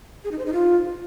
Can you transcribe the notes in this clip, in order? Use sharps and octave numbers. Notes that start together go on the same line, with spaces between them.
G#4
D#4
C5
D#4
F4